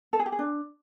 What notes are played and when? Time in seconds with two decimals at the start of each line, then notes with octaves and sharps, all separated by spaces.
0.13 A4
0.19 G#4
0.26 G4
0.32 G#4
0.39 D4